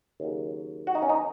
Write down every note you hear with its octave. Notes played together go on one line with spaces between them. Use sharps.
D#2 C#3 F#3
F#4
D#4
C#4
D#4